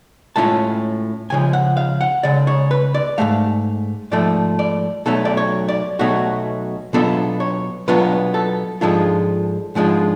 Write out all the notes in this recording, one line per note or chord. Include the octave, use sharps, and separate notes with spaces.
A2 G#3 C#4 F4 A5
C#2 C#3 F3 G#5
F#5
F5
F#5
C#2 C#3 D5
C#5
B4
D5
G#2 F3 A3 F5
G#2 F3 A3 D5
D5
B1 B2 F#3 A3 A4
D5
C#5
D5
B1 B2 F#3 A3 F#4
B2 F#3 B3 D4 F4 A4
C#5
B2 F#3 B3 D4 F4 B4
A4
G#2 F3 G#3 D4 F4 A4
G#2 F3 G#3 D4 F4